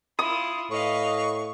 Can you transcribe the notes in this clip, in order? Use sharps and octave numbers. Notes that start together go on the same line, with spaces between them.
E4 F4 D#6
A2 B4 D#5 F5 C#6